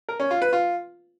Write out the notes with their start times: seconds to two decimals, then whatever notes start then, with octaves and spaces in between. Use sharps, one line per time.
0.09 A#4
0.20 C#4
0.31 F4
0.42 B4
0.53 F4